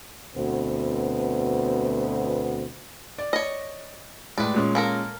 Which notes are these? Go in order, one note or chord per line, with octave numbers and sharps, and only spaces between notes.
D2 B2 B3 C4
D5
C#5 D#5
A2 G#3 B4 D5
A#2 G#3 C#4
A#3 A4 A#4